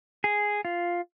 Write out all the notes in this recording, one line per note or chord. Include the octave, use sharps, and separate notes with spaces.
G#4
F4